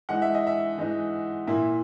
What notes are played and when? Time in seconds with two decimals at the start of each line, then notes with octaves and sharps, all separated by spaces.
0.09 E3 G#3 D#4 F#5
0.22 E5
0.34 D#5
0.47 E5
0.78 E3 G#3 D#4
1.47 A#2 A#3 E4